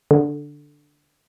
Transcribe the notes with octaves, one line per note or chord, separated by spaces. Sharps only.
D3